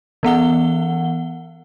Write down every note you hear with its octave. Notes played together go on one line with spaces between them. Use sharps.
E3 B3 F#5 G7